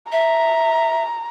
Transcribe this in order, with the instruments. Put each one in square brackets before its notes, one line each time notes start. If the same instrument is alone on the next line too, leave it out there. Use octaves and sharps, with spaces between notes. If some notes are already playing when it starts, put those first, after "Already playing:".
[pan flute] E5 [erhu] A#5